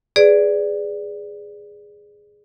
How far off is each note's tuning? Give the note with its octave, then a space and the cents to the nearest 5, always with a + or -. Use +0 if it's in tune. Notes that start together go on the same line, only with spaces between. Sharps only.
G#4 +0 B4 +25 D5 +0